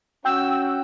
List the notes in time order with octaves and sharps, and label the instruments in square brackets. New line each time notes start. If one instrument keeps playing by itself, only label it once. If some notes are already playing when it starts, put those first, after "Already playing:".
[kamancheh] C#4 F#4 [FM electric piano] G5 G6 [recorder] E6